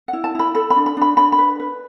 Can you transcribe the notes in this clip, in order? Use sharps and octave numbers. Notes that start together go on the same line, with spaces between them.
F#5
E4
A5
E4 B5
A4 B5
B5
D4
B5
D4 B5
D4 B5
B5
B4
B4